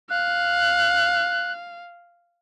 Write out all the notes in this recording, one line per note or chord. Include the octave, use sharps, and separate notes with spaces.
F5 F#6